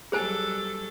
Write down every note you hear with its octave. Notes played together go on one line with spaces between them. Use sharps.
F#3 G3 G#4 A4 C5 G#5